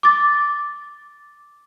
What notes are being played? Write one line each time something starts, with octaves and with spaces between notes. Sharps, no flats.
D6 A6